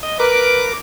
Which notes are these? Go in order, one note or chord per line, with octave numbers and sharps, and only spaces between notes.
D#5
A#4 B4 D6